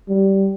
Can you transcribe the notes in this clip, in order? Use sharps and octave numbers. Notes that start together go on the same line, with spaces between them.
G3